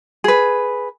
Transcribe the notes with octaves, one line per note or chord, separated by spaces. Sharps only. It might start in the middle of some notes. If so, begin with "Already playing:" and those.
G#4 B4